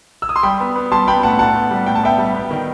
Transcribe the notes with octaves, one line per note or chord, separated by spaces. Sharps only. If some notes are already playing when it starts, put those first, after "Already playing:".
E6
D#6
C6
G3 G5 B5
B3
B3
G3 A5 C6
B3 G5 B5
A2 F#5 A5
A2 F#5 A5
B3
G3
A2 G5
A5
B3 E5 G5
G3
B3
D#3